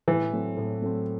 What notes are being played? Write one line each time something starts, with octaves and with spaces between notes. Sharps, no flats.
A2 E3
F#3 A3 C4
A2
F#3 A3 C4